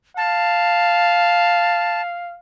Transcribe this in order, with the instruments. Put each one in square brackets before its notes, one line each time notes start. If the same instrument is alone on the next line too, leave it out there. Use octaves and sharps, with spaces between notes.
[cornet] F5 [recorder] A5